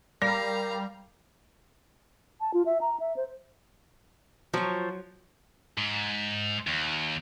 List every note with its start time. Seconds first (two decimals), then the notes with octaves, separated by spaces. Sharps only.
0.22 G3 A#4 F5 A#5 A#6
2.41 A5
2.54 F4
2.66 E5
2.81 A#5
3.00 E5
3.16 C5
4.54 F3 F#3 C#5
5.78 G#2
6.67 D#2